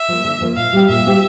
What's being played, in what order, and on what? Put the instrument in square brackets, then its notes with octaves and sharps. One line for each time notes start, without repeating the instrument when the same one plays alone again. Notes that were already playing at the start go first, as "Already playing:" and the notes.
Already playing: [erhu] E5
[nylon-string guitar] F3 A#3
D3
F3 A#3
[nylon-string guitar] A#2 [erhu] F5
[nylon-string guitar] G3 C4 G4
[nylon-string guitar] A#2 [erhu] E5
[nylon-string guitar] G3 C4 G4